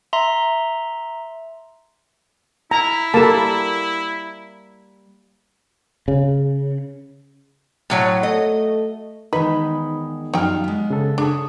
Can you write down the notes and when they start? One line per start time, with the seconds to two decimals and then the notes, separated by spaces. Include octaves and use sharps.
0.13 E5 A#5 C6
2.71 E4 A#5
3.14 G3 A#3 A4 A5
6.08 C#3
7.90 A2 F#3 C#5
8.23 A3 D#5
9.33 E2 D#3 G#3 D#4 B4 B5
10.34 F#2 F3 G3 D#4 D5 F5 G5 F6
10.64 G#3 B3
10.90 C#3 A4
11.18 D4 G#4 C#5 E5